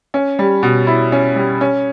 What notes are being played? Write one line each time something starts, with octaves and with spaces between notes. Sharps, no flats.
C#4
G3
B2
E4
C#4
G3
C#4